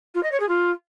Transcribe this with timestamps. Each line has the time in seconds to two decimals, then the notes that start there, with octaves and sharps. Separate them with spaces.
0.15 F4
0.23 D#5
0.32 C#5
0.40 G#4
0.49 F4